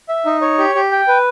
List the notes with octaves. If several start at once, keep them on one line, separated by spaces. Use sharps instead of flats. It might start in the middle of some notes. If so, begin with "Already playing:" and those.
E5
D#4
C#5
G4
G4
G5
B4